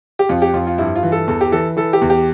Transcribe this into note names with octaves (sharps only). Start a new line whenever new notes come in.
G4
F2 F4
G4
F2 F4
F4
G2 E4
F4
E3
A4
E2 A4
G4
E3 A4
E3 A4
G4
E2
G4